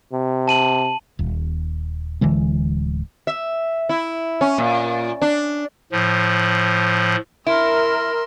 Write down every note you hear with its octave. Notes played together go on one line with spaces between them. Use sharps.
C3
A5 D#7 F#7
D#1
D1 D3 E3 G#3
E5
E4
C#4
A#2
D4
A2 F3
E4 A#4 E5 C6